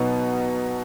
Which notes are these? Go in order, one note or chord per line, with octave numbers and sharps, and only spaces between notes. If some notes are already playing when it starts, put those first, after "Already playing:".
Already playing: B2 F#3 B3 D#4